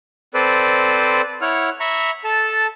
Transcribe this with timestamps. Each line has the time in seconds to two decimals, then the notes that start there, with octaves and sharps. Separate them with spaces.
0.34 C4 A4 B4 C5 D5
1.41 E4 C#5 F#5 F6
1.80 E5 A#5 B5 C#6
2.24 A4 A5